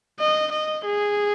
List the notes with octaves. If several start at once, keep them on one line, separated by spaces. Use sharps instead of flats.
D#5
D#5
G#4